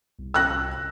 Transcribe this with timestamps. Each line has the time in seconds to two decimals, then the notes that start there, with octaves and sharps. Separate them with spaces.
0.19 C2
0.34 E6 F#6 A#6